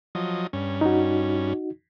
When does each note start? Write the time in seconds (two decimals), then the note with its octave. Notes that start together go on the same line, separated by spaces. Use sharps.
0.15 F3 F#3 D#5
0.53 G2 C#4
0.81 D#4 F#4